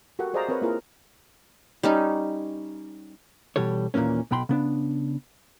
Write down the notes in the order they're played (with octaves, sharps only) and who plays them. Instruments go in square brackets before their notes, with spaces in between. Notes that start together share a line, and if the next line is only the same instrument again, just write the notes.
[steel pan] F#4 G4 A4 A#4 F#5
G#4 C5 D5 D#5 F5 A#5
C4 A#4 B4 C#5
A#3 E4 F4 G#4 A#4
[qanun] G3 C#4 D#4
[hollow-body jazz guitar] B2 E3 G3 A4 C#5
D#2 A#2 D#3 E3 A#3 C#4
B1 B2 G5 B5 C6
C#3 B3 D4